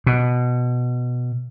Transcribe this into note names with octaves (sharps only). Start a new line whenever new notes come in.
B2